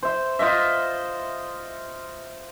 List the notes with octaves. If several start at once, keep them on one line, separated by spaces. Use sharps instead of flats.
C5 E5
F4 C5 D#5 E5